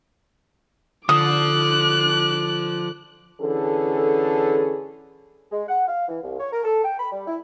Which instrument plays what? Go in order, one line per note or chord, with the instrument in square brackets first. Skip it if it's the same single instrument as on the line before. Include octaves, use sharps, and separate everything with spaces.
[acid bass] D3 [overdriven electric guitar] F3 [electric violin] D6 F#6 [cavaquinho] D#6
[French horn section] D3 E3 C#4 G#4 A4
[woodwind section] G#3
F#5
F5
E3
C2
C#5
A#4
A4
G5
B5
G3
E4